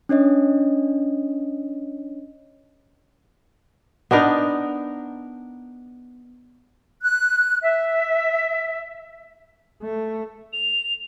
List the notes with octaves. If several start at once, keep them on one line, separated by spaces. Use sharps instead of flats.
C#4 D4 C#5 D#5
B3 D4 D#4 A#4
F#6
E5
A3
F7